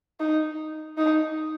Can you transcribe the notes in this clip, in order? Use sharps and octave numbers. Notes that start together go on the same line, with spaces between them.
D#4
D#4